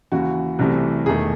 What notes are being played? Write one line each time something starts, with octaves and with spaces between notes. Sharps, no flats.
D#2 C#3 E3 F#4
C2 C3 E3 A3
E1 E2 D#3 A3 G#4